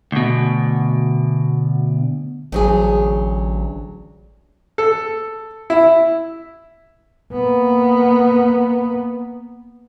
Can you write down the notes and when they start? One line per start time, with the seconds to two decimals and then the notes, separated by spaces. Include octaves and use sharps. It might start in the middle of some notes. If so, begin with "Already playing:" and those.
0.12 D2 B2
2.52 A1 D2 F#3 G#4
4.78 A4
5.70 E4
7.32 A#3 B3